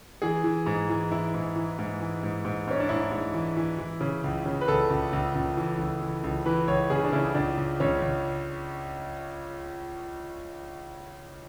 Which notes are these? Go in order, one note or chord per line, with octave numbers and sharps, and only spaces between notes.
E3 G#4
E3
G#2
E3
E3 E4
G#2
E3
G#2
E3
G#2
G#2
G#2 C#4
D4
G#2 E4
G#2
E3
E3
E3
C#3
C#2
C#3
B4
C#2 A4
C#2
C#2
C#2
E3
C#2
E3
C#2
E3 B4
C#2 C#5
C#3 G#4
D4
C#3 E4
C#2 D4
C#2
C#2 C#4
C#2